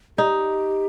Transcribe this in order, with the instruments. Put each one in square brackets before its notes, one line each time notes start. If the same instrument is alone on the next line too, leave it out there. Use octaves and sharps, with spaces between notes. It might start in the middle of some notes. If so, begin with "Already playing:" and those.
[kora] D#4 [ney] G4 G#4